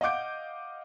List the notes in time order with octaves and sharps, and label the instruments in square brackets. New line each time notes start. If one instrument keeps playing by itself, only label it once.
[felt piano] D#5 F5 F#5 D6 G6 D7